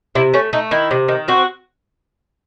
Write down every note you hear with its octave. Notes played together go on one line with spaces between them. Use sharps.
C3 E4
A3 C#4
A3 D#4
D#3 E4
C3
D#3
C4 F#4